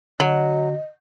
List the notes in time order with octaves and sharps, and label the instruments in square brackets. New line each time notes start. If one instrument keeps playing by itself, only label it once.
[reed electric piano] D3 F#4 [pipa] F#3 [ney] D#5